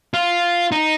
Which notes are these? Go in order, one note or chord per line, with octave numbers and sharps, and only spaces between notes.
F4
D#4